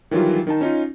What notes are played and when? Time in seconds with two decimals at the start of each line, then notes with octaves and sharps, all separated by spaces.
0.11 D#3 E3 F#3 G3 F4
0.47 D#3 D#4 A5
0.61 C#4 D#4 F4